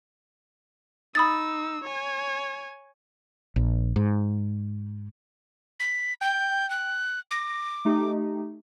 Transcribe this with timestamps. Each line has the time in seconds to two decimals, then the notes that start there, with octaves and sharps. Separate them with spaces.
1.15 D#4 B5 D#6 E6 A6
1.84 C#5 G#5
3.56 A#1
3.96 G#2
5.80 B6
6.21 G5 G6
6.70 F#6
7.31 D6 A#6
7.85 A3 D#4 G4